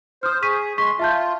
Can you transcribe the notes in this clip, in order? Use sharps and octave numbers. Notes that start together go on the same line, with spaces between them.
C5 D#6 F6
G#4 C#6 B6 D#7
G#3 C6 C#6 B6
F4 E5 A5 G6